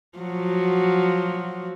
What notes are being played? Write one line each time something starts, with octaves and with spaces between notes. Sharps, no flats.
F3 F#3 F#4